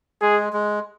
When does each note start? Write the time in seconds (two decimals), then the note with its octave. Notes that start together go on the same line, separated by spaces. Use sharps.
0.21 G#3 G#4
0.53 G#3